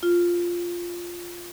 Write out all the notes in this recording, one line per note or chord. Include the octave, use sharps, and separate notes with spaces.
F4